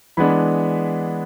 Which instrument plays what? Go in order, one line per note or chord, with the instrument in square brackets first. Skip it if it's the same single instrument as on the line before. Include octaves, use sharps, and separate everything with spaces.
[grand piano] E3 G#3 B3 D4 B5